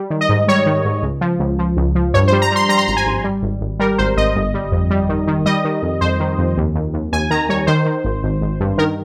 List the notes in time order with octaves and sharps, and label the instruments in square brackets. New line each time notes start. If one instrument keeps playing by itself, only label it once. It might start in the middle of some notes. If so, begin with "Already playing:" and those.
Already playing: [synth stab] G3
D#3
D#5
G#2
G3 C#5
D#3
G#2
C#2
F3
C#2
F3
C#2
F3
G2 C#5
C5
G3
A#5
G3 C6
G3 A#5
C6
G#1 A#5
G#5
G#1
G3
G#1
G#1
G3 A#4
G#1 C5
G#1 D#5
G1
G3
F2
G3
D#3
D#3
G3 D#5
D#3
F2
F2 C5
D#3
F2
D#2
D#2
D#2
D#2 G#5
D#3 A#5
G3 C#5
D#3 C5
D#3
G#1
G#1
G#1
G2
D#3 A#4